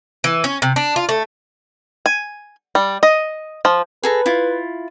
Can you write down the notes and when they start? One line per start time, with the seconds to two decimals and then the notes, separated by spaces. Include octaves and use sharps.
0.24 E3
0.44 C#4
0.62 C3
0.76 D4
0.96 F4
1.09 A3
2.06 G#5
2.75 G3
3.03 D#5
3.65 F3
4.03 G#4 A4 B4 A#5
4.26 E4 F4